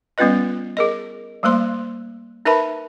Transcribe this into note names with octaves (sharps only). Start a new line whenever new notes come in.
G3 B3 C#4 F4 B4 D#5
G#4 A#4 D#5
G3 A3 A#3 C5 C6
D#4 A#4 B4 E5 A5 B5